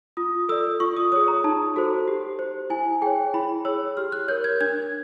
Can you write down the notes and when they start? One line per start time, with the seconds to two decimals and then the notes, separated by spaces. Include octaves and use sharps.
0.17 F4 D#6
0.49 A4 D5 E6
0.80 F4 C#6
0.97 D#6
1.12 G#4 C#5 D#6
1.28 A#5
1.44 D#4 A5
1.76 F#4 A4 C5
2.08 G4
2.39 C5
2.70 E4 G#5
3.02 G#4 C#5 G5
3.34 E4 B5
3.65 G#4 C#5 E6
3.97 G4 F6
4.12 F#6
4.28 A#4 C#5 G6
4.44 G#6
4.61 D4 G#6